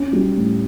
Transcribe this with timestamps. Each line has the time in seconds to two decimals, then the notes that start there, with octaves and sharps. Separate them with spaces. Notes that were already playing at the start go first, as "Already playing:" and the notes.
Already playing: C#4
0.13 G3
0.37 A2